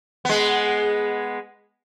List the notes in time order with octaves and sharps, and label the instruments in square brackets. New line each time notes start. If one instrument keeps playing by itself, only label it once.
[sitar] G#3 B3